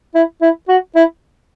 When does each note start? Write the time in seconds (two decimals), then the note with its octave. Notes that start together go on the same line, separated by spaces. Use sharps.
0.15 E4
0.42 E4
0.68 F#4
0.95 E4